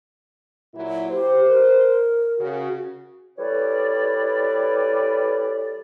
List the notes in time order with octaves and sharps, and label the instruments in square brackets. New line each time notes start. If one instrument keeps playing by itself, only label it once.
[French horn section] A#2 F#3 E4
[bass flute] G4 [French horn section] C5
[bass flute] A#4
[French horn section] C#3 F#4
[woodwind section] E3 G3 A4 B4 C#5 D5